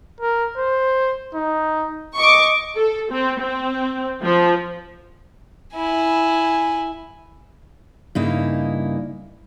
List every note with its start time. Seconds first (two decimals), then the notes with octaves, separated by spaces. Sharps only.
0.21 A#4
0.58 C5
1.35 D#4
2.17 D#5 C#6 D6
2.76 A4
3.11 C4
3.40 C4
4.22 F3
5.75 E4 G#5
8.15 G2 C#3 A#3 D#4 E4